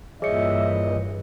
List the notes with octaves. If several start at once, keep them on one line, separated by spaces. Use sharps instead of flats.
G2 A#2 E3 G#4 C#5 D#5 E5 C#7